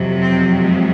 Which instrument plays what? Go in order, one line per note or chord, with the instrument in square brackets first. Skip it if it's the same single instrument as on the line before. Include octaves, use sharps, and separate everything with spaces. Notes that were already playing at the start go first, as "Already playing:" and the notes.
Already playing: [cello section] F2 C3 F#3
C4
G#3